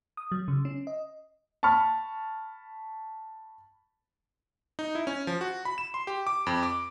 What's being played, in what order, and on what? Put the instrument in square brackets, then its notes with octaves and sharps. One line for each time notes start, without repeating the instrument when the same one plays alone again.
[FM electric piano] D#6
F#3
C#3
C#4
D#5
[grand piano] A5 B5 C#6 F6
[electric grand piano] D#4
E4
C#4
F3
F#4
B5
E7
C6
G4
D6
F2
D6